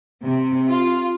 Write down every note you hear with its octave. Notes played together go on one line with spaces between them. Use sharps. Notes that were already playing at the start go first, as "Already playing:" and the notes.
C3
F4